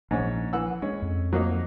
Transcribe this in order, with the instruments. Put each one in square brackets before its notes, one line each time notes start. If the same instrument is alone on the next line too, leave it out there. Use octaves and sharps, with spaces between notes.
[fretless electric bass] A#1 [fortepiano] G#2 C#4
[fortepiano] E3 F#5 E6
[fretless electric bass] G#3 [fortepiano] C#4
[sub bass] F2
[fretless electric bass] F3 [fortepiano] F#3 A#3 D#4